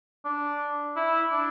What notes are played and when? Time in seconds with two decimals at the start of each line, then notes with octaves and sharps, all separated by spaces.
0.25 D4
0.96 E4
1.32 D4